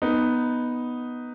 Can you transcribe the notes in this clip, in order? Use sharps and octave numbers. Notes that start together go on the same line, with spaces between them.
B3 D#4